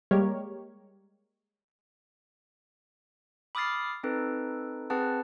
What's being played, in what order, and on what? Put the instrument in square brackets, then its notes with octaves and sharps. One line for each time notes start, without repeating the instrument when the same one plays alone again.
[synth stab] G3 G#3 A#3 G4 A#4 C#5
[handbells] B5 D6 D#6 F6 A6 C7
C4 D#4 A4 B4
C4 G#4 B4 F#5 A5